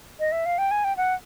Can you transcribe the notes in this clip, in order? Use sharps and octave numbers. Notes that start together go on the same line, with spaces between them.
D#5
E5
F5
G5
G#5
G5
F#5